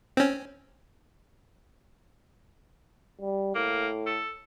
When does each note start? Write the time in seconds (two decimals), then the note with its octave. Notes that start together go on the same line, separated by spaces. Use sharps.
0.17 C4 C#4
3.21 G3
3.55 A2 A#3
4.06 A4